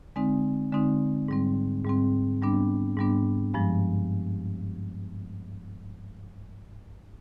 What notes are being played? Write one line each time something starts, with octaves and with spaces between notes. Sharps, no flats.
D3 G#3 C4 D#4
D3 G#3 C4 D#4
G#2 G3 C4
G#2 G3 C4
G#2 G3 B3 D4
G#2 G3 B3 D4
G2 F3 G#3